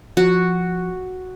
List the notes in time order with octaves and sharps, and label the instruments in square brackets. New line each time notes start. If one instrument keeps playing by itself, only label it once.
[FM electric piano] F3 [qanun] F#4